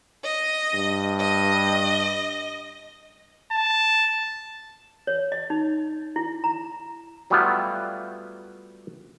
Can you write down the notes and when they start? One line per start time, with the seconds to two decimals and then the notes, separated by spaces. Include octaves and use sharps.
0.24 D#5
0.74 G2
1.19 D#5
3.52 A5
5.07 C#5
5.32 D#5
5.50 D#4
6.16 E4
6.44 A#5
7.30 F#3 G3 A3 B3 E4 F4